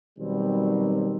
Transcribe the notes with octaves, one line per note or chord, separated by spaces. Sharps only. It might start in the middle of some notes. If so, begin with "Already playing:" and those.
B2 D#3 F#3 G3 C4